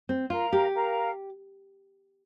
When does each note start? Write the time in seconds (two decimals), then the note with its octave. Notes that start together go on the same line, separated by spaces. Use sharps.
0.09 C4
0.30 F4 A#4 F5 A#5
0.53 G4
0.74 A#4 F5 A#5